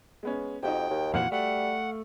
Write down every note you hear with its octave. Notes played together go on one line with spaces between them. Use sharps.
G#3 B3 C#4
F2 D#4 F#4 G4 G5
D#2
F2 A#2 E3 F#4 F5 F#5
G3 A3 F#5